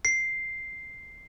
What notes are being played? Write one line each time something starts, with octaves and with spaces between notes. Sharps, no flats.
C7